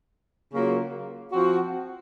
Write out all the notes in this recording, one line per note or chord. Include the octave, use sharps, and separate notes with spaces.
C#3 F#3 A#3 F4
F3 C4 F#4